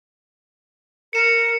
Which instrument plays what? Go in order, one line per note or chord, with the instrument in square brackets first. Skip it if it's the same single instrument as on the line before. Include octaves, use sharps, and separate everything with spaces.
[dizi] A#4 [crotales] C#7 E7